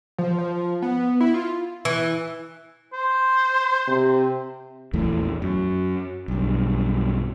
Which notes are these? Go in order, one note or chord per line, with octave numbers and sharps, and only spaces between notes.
F3
F3
B3
E4
F4
E3
C5
C3
A#1 E2 E3 A3
F#2
B1 G2